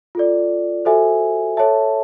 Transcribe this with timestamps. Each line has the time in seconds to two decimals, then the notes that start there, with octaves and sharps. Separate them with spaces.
0.15 F4 A4 D5
0.85 F#4 A4 C5 E5 G#5
1.57 A4 C#5 E5 A5